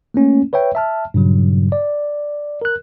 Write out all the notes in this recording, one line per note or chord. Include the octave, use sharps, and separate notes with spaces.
A3 A#3 C#4
B4 C#5 E5 G5
E5 A5 F6
G2 A#2 C#3 F#3
D5
A#4 F#6